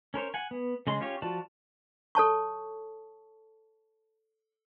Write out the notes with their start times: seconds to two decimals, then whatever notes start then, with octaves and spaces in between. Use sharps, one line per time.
0.14 C#4 A#4 C5 C#5
0.34 F#5 G#5
0.51 B3
0.87 C#3 G#3 C6
1.00 C#4 F4 G4 C#5
1.22 F3 F4 F#4 D5 A5
2.15 A4 C#5 A5 C#6